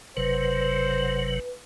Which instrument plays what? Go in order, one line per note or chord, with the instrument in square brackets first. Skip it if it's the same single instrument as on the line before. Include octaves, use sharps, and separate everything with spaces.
[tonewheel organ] F#1 C3 F#3 [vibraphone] B4 [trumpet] C5